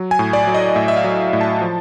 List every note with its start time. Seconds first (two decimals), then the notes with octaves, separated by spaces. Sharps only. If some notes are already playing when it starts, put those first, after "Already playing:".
Already playing: F#3
0.11 G#5
0.19 A2
0.33 D5
0.47 F#3
0.54 D#5
0.76 A2 E5
0.88 E5
0.97 F5
1.04 F#3
1.33 A2
1.41 A5
1.61 F3